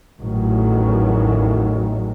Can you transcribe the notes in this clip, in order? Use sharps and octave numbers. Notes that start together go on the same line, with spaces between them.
A1 E2 A2 D#3 F#3